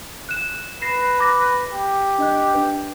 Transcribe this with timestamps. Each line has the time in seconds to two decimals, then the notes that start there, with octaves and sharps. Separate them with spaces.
0.29 F#6 E7
0.82 B4 A#6 C7 E7
1.19 A#5 D6 A#6
1.73 G4
2.18 D4 D#5 F#6
2.54 D4 B4